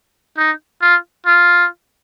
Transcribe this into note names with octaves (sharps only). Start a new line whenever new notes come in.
D#4
F4
F4